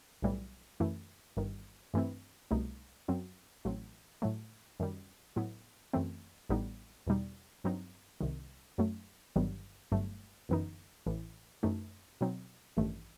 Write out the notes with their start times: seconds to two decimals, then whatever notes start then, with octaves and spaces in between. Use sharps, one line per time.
0.22 B1 A2 E3 G3
0.80 F#2 E3 A3 E4
1.37 G1 G2 D#3
1.94 G2 E3 A3 C4 E4
2.51 C2 B2 A3 D#4
3.08 F#2 F#3 C4
3.65 A1 A2 F#3 C4
4.22 A2 F#3 A3
4.80 F#2 D#3 G3
5.36 A2 F#3 B3 E4
5.93 F#2 E3 A3 C4
6.49 A1 A2 G3 B3 D#4
7.07 E2 B2 G3 D#4
7.64 G2 F#3 C4 D#4
8.21 C2 C3 D#3
8.78 F#2 F#3 A3
9.36 G1 G2 D#3 F#3 B3
9.92 G1 G2 F#3 A3
10.49 G1 F#2 E3 B3 D#4
11.06 A1 A2 E3
11.63 F#2 E3 A3 D#4
12.21 B2 F#3 C4 D#4
12.77 A1 G2 D#3 A3